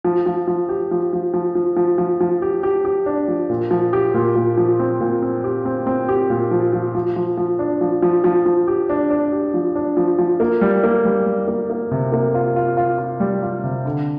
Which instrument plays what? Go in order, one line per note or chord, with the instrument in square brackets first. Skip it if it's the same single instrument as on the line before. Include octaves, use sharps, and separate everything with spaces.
[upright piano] F3
F3
F3
G4
F3
F3
F3
F3
F3
F3
F3
G4
G4
G4
D4
F3
A#2
F3
G4
A#2
A#2
F3
C4
A#2
C4
G4
C4
C4
G4
A#2
F3
F3
F3
F3
F3
D4
F3
F3
F3
F3
G4
D4
D4
G4
F3
D4
F3
F3
A#3
G3
A#3
G3
G3
A#3
A#3
C3
A#3
F4
F4
F4
F4
G3
F4
C3
D3